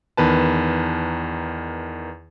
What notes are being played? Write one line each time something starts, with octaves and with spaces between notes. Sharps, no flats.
E2 D#3 B4 A5